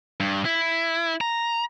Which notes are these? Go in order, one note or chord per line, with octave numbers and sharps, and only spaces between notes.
G2
E4
A#5